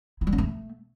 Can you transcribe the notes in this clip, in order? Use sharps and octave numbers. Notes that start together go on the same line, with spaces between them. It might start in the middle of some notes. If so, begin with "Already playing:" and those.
E4
G3
C#4
A3